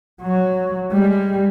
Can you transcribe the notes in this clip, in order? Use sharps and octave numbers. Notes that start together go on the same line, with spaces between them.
F#3
G3 G#3